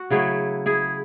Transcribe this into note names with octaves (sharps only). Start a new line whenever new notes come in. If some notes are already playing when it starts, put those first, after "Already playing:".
Already playing: F#4
C#3 F#3 A3 E4 G#4
E4 G#4